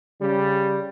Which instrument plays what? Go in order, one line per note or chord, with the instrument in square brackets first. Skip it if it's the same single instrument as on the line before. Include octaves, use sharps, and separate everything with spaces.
[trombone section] C#3 G3